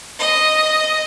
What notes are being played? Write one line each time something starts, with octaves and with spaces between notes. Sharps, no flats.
D#5